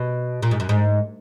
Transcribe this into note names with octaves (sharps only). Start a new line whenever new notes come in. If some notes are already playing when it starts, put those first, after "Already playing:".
Already playing: B2
A#2
G#2
F#2
G#2